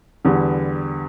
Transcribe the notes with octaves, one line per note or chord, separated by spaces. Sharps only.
E2 D3 G3 B3